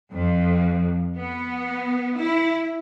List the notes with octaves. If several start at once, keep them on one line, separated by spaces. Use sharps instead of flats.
F2
B3
E4